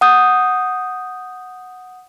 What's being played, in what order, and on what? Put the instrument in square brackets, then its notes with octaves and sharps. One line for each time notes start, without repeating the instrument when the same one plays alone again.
[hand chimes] F#5 D#6 G6